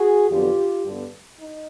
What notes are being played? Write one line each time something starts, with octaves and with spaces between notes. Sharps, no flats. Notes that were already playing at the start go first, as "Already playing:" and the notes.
Already playing: F#4 G#4
F2 D3 F#3 B3 F4 G4
G2 D3 G3 B3
D#4